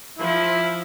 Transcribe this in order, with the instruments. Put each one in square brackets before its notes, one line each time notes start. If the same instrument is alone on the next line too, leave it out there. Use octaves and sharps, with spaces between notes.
[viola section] F3 [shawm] E4